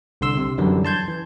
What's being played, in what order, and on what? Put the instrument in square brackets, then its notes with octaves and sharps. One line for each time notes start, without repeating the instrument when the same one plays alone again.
[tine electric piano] C2 D3 C6 E6
C3
F#2 D3 E3 F#3 G3
A5 C6 G6 G#6
E3